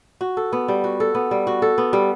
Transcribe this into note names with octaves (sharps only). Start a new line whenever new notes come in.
F#4
A4
B3
G3
F#4
A4
B3
G3
F#4
A4
B3
G3